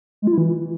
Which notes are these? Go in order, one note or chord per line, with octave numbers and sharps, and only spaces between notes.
G#3
F4
E4
E3